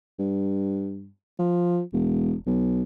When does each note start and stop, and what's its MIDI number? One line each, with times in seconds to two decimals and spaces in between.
0.19 1.09 43
1.39 1.81 53
1.93 2.34 28
2.47 2.83 35